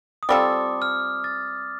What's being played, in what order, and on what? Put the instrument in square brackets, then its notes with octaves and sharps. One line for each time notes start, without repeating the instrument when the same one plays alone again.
[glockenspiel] D#6
[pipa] G3 C4 F4 A4 [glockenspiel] D6
[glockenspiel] F6
A6